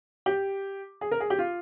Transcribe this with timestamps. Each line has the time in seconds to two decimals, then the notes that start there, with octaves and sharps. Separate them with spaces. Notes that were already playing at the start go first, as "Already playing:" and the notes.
0.26 G4
1.01 G#4
1.11 A#4
1.20 G#4
1.30 G4
1.39 F4